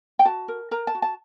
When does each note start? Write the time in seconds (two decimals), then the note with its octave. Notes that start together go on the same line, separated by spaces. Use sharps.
0.19 G5
0.25 F#4 A5
0.48 A#4
0.71 A#4 A#5
0.87 A5
0.95 F#4
1.02 A5